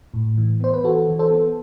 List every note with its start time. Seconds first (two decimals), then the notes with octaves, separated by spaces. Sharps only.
0.14 A2
0.38 E3
0.60 B3 C5
0.74 B4
0.84 E3 F#4 A4
1.08 E3
1.19 A4 C5
1.31 B3